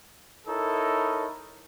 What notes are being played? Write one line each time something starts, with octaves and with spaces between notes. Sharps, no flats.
D#4 E4 A4 A#4 C#5